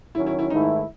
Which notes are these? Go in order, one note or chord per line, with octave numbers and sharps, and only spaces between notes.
D#3 F#3 C#4 E4
E4
E4
G#2 D#3 A3 D#4 E4